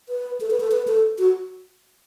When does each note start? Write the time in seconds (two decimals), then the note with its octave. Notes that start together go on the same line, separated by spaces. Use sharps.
0.09 B4
0.41 A4
0.50 B4
0.60 A4
0.71 B4
0.88 A4
1.19 F#4